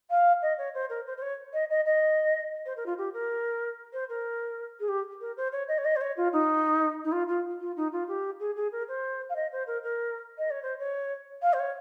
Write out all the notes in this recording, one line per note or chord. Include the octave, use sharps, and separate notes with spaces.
F5
D#5
C#5
C5
A#4
C5
C5
C#5
D#5
D#5
D#5
C5
A#4
F4
G4
A#4
C5
A#4
G#4
G4
A#4
C5
C#5
D#5
C#5
D#5
C5
C#5
F4
D#4
D#4
F4
F4
F4
D#4
F4
G4
G#4
G#4
A#4
C5
F5
D#5
C5
A#4
A#4
D#5
C#5
C5
C#5
F5
C5
C#5